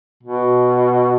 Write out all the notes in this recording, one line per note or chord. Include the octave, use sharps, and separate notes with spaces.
B2